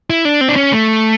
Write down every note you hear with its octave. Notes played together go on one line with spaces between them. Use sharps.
E4
D4
C4
D4
C#4
A3